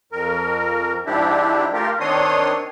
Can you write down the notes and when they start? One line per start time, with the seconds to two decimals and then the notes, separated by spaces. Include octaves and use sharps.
0.12 F2 A#4
1.06 G#2 F3 D4 E4 G4
1.73 A3 F4 G4 A#4
2.00 D#3 C4 D4 C#5 C6 D#6